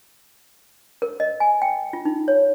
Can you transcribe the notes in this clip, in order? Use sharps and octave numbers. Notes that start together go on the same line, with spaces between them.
A#4
D#5
G#5
G5
F4
D#4
C#5